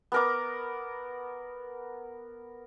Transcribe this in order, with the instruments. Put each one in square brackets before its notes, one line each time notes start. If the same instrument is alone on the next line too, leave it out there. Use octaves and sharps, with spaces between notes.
[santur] B3 A#4 D6